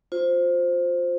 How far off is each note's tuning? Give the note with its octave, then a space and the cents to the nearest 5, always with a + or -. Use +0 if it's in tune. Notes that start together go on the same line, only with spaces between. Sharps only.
F4 +25 C5 +0